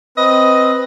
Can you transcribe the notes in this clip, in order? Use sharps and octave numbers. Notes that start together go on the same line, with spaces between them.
C4 B4 D#5